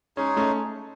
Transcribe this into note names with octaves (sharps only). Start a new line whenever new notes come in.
G#3 C#4 D#4 G#4 C#5
A3 C#4